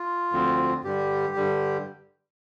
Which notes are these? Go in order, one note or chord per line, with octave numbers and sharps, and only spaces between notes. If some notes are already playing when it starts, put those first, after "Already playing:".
Already playing: F4
D2 D3 F3 C4
G2 D3 G3 G4
G2 D3 G3